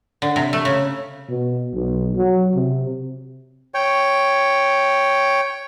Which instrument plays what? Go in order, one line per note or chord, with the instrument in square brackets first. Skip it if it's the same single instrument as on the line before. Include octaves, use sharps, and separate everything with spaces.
[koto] D3
C3
A3
C#3
[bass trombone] B2
B1
F#3
C3
[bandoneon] C#5 G5